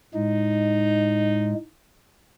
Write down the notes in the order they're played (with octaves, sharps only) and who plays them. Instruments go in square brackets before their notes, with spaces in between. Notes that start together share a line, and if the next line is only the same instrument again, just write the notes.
[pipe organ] A2 G#3 [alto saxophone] D#4